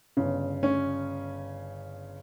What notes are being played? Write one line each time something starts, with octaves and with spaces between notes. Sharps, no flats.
G1 C#3
C#4